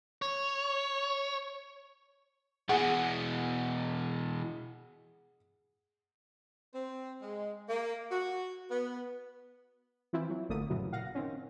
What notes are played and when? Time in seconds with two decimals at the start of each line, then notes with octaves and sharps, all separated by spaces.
0.22 C#5
2.69 B2 E3 G#4 F#5
6.73 C4
7.21 G#3
7.69 A#3
8.11 F#4
8.70 B3
10.13 E3 C4 E4 F4
10.30 F#3
10.49 G#1 D3 A3 A#3 D#6
10.70 F#2 A#2 C#3 E3 F#3
10.92 A#2 F5 F#5 A#6
11.15 D#3 C4 C#4